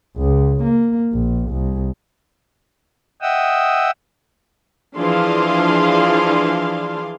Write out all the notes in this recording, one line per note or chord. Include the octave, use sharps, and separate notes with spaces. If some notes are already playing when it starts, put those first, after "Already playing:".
C#2
A#3
A#1
C2
D#5 E5 F#5 G5 D#6 E6
E3 F3 D4 G#4 F5 C6